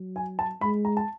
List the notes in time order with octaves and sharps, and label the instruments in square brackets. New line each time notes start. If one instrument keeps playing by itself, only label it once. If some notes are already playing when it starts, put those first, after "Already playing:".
Already playing: [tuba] F#3
[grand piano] G#5
A5
[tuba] G#3 [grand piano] B5
[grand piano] A#5
A5